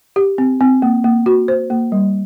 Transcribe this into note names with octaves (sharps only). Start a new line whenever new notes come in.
G4
C4
C4
A#3
A#3
F#4
C5
A#3
G3